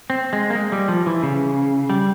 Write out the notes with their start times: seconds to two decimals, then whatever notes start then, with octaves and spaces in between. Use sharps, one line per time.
0.10 C4
0.33 G#3
0.50 A#3
0.55 G#3
0.72 G3
0.88 F3
1.06 E3
1.23 C#3
1.90 G3